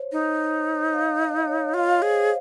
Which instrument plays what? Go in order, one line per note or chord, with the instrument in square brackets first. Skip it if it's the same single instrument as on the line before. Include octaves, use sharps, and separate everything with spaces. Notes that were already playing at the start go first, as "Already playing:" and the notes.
Already playing: [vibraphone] C5 C#5
[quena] D#4
[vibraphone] F5
D#5
C#5
[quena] F4 [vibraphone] F5
[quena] G#4 [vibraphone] C5
[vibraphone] C5